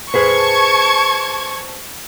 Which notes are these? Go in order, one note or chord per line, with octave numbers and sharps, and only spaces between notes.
G#4 B4 C5 A5 C#6 G#6